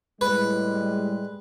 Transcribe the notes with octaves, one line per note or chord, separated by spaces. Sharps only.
A2 G3 G#3 B4